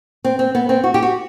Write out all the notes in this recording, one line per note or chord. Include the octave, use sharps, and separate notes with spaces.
C4
C4
B3
C4
F#4
G4
F#4